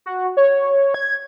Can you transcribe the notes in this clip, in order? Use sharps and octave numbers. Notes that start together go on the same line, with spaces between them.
F#4
C#5
G#6